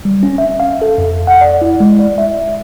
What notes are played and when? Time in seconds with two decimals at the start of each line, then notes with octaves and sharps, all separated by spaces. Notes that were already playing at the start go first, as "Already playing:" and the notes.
0.05 G3
0.23 C#4
0.38 E5
0.60 F5
0.82 A4
0.98 F2
1.27 F#5
1.41 D5
1.62 E4
1.80 G#3
1.99 D5
2.18 E5